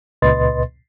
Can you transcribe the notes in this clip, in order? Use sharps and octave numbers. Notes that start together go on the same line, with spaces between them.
C#2 A#2 B4 D#5 C6 A6